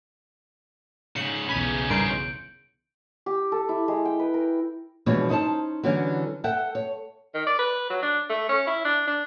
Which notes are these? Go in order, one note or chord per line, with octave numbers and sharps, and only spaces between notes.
G#2 C#3 C#7 F#7
B1 E2 C#3 C#4 D#4 B5 D#7
G2 A#4 C6 G6 D7
G4
A4
E4
G#3
G5
B4
A#4
B2 E3 F3 G#3 D4 C#5
C#4 D#4 E4 C5 A5
D3 E3 F#3 G3 C#4
A4 E5 F#5 G5
C#5
D#3
D5
B4
F#3
D4
A3
C#4
E4
D4
D4